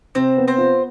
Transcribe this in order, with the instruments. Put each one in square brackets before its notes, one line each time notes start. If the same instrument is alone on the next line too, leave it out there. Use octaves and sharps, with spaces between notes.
[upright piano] C3 [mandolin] C4 C5
[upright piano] B3
[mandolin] C4 C5
[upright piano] F4